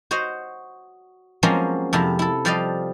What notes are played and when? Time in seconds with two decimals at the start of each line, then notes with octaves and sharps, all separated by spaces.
0.11 F#4 C5 C#5 D#5
1.43 F3 F#3 G#3 A#3 C4 C#4
1.93 F2 C3 F3 E4
2.19 E4 A4
2.45 F3 G3 D5 D#5 F5